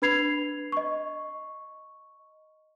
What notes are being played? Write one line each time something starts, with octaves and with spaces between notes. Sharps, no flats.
D4 B4 B5 G#6 C7 F7
D#5 C#6